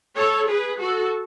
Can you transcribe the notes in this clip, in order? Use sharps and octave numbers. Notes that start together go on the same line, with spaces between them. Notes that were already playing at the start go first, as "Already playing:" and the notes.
A4 C#5
G#4 B4
F#4 A4